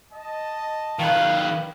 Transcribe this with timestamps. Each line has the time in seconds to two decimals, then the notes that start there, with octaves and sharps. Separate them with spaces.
0.13 D#5 A5
0.99 D#3 B4 F5